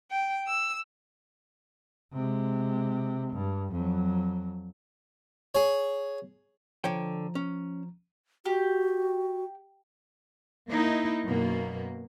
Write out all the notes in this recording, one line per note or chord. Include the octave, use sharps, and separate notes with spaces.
G5
E6
C3 G#3
G2
F2 F#3
G#4 C#5
D3 F3 C#5 G5 A#5
C#4
F#4 G4
A#3 D#4 E4
F#2 B2 A#3